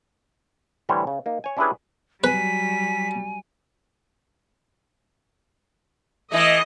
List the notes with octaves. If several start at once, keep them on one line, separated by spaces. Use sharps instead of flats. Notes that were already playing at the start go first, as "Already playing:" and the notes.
A2 D3 E3 G3 C5 C#5
C#3
A#3 D#4
C#5 G#5
C#4 D4 E4 G4 G#4 B4
F#3 G3 B4 G#5 B6
E3 A3 D#5